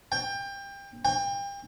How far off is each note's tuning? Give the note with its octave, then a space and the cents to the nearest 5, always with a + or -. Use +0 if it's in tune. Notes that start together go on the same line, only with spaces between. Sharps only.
G5 +25
G5 +35